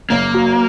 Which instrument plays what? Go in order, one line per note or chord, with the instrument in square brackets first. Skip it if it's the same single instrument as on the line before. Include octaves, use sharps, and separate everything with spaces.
[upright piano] F#1 [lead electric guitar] A#3
[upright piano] F#3